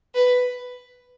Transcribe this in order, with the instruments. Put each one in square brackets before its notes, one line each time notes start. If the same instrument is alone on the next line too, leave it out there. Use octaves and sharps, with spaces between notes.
[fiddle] B4